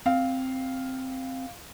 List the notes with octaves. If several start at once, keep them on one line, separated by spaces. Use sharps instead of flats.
C4 F5